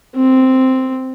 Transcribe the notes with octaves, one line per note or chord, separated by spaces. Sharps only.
C4